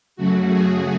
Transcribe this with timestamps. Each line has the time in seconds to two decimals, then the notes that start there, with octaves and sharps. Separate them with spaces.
0.16 F#2 C#3 F#3 A3 F#4
0.47 G#4